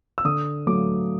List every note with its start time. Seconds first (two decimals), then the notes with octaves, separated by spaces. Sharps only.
0.18 E6
0.25 D3 D#6
0.67 F#3 A3 D6